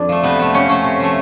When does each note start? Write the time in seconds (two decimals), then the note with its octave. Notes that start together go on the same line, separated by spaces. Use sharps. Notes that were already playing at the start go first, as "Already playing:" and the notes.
Already playing: F2 D4
0.09 F3 A3
0.23 C3 B3
0.39 F3 A3
0.54 C3 C#4
0.69 F3 A3 C#4
0.84 C3
1.00 F3 A3